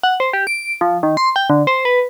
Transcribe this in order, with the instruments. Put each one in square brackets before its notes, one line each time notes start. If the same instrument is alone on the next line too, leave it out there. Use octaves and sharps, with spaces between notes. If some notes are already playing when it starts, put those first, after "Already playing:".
[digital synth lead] F#5
C5
G4
D7
F3
D#3
C6
G5
D3
C5
B4